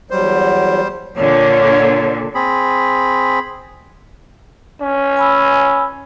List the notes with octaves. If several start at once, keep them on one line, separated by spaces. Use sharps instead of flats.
E2 F#3 G3 C5
A#2 D3 C#5
C4 G#4 B5
C#4
G#5 B5 E6